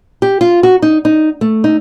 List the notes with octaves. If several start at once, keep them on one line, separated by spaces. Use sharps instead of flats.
G4
F4
F#4
D#4
D#4
A3
D#4